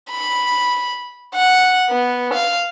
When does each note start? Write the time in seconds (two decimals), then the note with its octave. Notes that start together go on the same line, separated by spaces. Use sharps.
0.11 B5
1.34 F#5
1.90 B3
2.33 F5